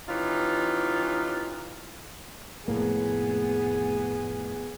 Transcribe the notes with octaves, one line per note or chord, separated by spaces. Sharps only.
E3 C#4 D#4 F4 G4
F1 A2 A#3 B3 G#4